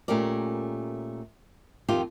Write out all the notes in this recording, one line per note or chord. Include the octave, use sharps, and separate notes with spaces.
A#2 A3 C#4 G4 A#4 D5
F2 D#3 D#4 F4 G4